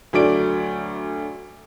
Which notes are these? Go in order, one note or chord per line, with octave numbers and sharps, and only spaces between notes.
D2 F#3 A3 D5 D7